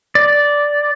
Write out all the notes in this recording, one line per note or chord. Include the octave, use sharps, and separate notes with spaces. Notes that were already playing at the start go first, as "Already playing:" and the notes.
D5